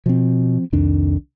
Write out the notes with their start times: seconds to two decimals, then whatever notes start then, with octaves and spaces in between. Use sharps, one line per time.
0.06 B2 F3 C4
0.73 C2 F2 D#3 D4